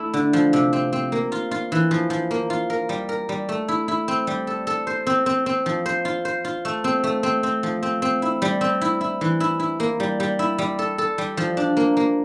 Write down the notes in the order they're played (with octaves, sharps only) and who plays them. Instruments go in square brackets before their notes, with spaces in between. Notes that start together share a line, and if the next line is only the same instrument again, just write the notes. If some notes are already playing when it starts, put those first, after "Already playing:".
Already playing: [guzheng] A3 E4
D3
F3
C3
C4
C4
A#3
F4
F4
E3
F3
F3
A#3
F4
A#4
G3
A#4
G3
A3
E4
E4
C4
G3
A4
A4
C5
C4
C4
C4
F3
C5
F4
C5
F4
A3
C4
A3
C4
C4
F3
C4
C4
E4
G3
C4
E4
E4
E3
E4
E4
A#3
G3
G3
E4
G3
A4
A4
G3
F3
D4
A#3
A#3